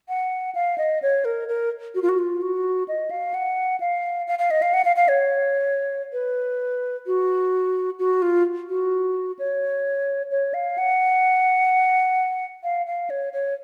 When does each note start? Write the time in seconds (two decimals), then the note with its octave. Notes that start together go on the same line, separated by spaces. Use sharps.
0.09 F#5
0.55 F5
0.78 D#5
1.02 C#5
1.25 A#4
1.49 A#4
1.95 F#4
2.02 F4
2.09 F#4
2.19 F4
2.42 F#4
2.88 D#5
3.11 F5
3.34 F#5
3.80 F5
4.28 F5
4.39 F5
4.51 D#5
4.62 F5
4.74 F#5
4.85 F5
4.96 F5
5.08 C#5
6.13 B4
7.07 F#4
7.99 F#4
8.22 F4
8.69 F#4
9.39 C#5
10.31 C#5
10.54 F5
10.78 F#5
12.64 F5
12.86 F5
13.10 C#5
13.33 C#5